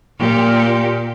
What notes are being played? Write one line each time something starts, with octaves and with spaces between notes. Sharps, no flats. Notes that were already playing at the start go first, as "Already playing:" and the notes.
A#2 G4